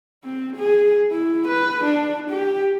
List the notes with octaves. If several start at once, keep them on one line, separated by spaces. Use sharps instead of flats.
C4
G#4
E4
B4
D4
G4